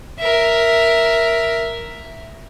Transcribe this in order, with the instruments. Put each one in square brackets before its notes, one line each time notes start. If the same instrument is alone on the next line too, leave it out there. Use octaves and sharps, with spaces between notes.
[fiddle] A#4 E5